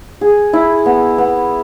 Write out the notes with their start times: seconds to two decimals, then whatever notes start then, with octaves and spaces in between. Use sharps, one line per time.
0.21 G#4
0.53 E4
0.86 B3
1.18 B3